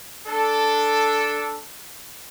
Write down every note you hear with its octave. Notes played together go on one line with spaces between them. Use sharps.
D4 A4